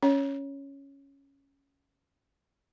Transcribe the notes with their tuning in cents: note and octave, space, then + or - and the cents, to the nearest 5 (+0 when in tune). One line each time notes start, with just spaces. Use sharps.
C#4 +0 C#5 +0